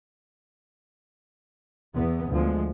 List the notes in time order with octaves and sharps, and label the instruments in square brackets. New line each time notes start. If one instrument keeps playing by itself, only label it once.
[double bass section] E2 B3
D2 F3 G#3